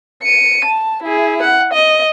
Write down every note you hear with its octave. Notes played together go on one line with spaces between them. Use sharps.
C#7 D#7
A5
E4 G#4
F#5
D#5